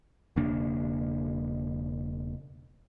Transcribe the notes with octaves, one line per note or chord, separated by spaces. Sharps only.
E1 C#3 A#3 D4